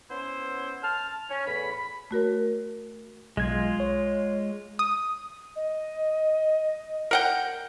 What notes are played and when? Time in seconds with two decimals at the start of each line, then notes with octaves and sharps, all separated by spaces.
0.11 B3 C#4 E4 C5
0.83 A5 F6
1.29 C#4
1.47 E2 A2 B5
1.71 B5
2.11 A3 F#4 A#4 C#5
3.37 B1 G#3 F4 G#6
3.80 C#5
4.79 D#6
5.56 D#5
7.11 A#4 F#5 G5